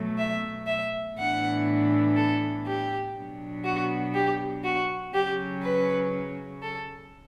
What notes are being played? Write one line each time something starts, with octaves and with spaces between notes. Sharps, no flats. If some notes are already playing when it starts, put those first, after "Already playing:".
Already playing: B2 F#3 A3
E5
E5
A2 E3 B3 D4 F#5
A4
G4
B2 F#3 B3 D4
F#4
G4
F#4
C#3 F#3 C#4 G4
B4
A4